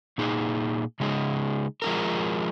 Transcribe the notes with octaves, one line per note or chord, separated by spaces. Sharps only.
A#2 A#3 D#4 G#4
C#3 G#3 D#4 G#4
F3 G#3 D#4 A#4